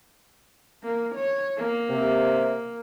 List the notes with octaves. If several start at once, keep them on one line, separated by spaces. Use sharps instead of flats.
A#3
C#5
A#3
C3